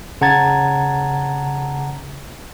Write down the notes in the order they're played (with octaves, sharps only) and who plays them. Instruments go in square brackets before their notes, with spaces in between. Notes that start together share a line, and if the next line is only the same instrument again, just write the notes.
[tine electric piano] C#3 F#5 A5 A#5 G#6 A6